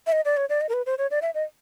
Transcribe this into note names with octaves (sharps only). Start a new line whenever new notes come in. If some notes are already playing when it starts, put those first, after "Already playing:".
E5
D#5
D5
C#5
D5
D#5
A#4
B4
C5
C#5
D5
E5
D#5